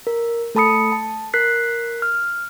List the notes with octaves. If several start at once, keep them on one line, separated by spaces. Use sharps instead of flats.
A#4
A3 A4 A5 B5 D#6 C#7
A5
A#4 F#6 B6 C7
F6